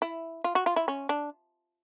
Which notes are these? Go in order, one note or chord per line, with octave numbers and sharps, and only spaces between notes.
E4
F4
F#4
F4
E4
C#4
D4